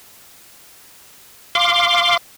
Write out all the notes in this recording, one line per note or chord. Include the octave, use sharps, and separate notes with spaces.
F5 C6 D6